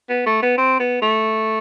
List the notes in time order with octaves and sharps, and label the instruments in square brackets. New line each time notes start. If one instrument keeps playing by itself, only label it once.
[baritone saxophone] B3
A3
B3
C4
B3
A3